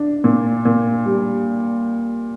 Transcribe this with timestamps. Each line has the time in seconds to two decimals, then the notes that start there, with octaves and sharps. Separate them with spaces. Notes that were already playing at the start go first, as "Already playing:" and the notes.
Already playing: D4
0.24 A#2
0.65 A#2
1.06 G3